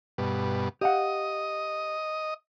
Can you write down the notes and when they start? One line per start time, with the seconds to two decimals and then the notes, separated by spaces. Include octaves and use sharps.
0.18 G2 B2
0.81 G4 D#5 F5 F#5